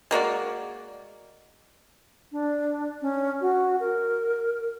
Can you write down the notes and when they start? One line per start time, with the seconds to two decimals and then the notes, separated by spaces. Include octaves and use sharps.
0.11 G#3 A#3 F#4 D5
2.32 D4
3.02 C#4
3.41 F#4
3.80 A#4